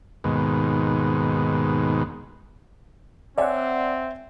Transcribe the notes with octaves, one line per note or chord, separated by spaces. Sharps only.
D#2 G#2 B2
C4 C#5 D5 E5 F#5 G#5